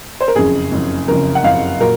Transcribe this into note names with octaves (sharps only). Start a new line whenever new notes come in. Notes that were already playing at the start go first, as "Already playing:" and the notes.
C5
A#4
F#1 F2 C#3 G#4
F#1 F2 C#3
F#1 F2 C#3 A#4
F#5
F#1 F2 C#3 F5
A#2 F#3 A#4